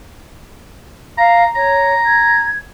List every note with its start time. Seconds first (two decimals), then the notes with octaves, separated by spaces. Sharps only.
1.18 F5 A#5
1.56 C#5 A#5
2.05 G#6